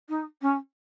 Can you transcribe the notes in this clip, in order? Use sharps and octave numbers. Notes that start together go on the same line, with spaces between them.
D#4
C#4